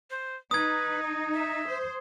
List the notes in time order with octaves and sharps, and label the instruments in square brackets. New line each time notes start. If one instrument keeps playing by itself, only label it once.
[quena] C5
[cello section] D#4 [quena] B4 [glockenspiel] D#6 G#6
[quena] D#5
E5
[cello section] C5